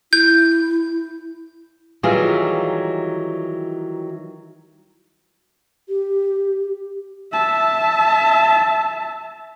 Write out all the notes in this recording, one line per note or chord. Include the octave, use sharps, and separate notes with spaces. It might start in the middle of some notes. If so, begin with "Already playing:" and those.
E4 G6
D#3 E3 F#3 G3 F4 G#4
G4
E5 A5